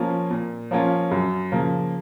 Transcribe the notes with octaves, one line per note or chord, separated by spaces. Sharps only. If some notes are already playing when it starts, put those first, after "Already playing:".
Already playing: F3 A#3 C#4 F4
A#2
F3 A#3 C#4 F4
F#2
C#3 F3 A#3